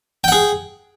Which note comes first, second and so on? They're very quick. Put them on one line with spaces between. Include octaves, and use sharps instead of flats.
G5 F#5 G#4